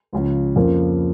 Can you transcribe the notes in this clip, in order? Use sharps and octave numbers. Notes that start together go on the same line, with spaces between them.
C#2 C#3 F3
F2 C#3 F3 A#3